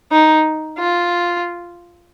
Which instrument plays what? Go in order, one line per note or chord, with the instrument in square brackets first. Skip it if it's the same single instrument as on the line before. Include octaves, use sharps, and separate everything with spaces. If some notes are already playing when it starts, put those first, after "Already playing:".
[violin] D#4
F4